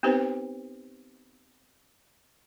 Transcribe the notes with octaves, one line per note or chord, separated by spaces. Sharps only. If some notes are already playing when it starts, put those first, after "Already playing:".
B3 C4 D#4 G4 B4 C5